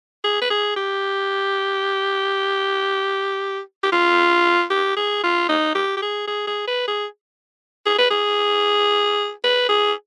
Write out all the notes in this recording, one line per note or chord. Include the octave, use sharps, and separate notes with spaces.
G#4
B4
G#4
G4
G4
F4
G4
G#4
F4
D#4
G4
G4
G#4
G#4
G#4
B4
G#4
G#4
B4
G#4
B4
G#4